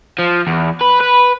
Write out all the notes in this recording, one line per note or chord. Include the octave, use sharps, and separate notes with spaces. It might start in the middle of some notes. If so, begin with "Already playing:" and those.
F3
E2
B4
B4